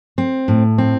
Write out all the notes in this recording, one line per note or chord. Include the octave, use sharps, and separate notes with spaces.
C4
A2
C4